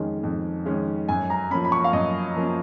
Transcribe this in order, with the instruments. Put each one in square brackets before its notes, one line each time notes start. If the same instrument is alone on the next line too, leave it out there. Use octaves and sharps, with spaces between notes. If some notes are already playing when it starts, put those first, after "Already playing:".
Already playing: [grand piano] F2 D#3 G#3 C#4
F2
D#3 G#3 C#4
F#2 G#5
A#5
F3 A#3 C#4 B5
B5
C#6
F5
F#2 D#5
F3 A#3 C#4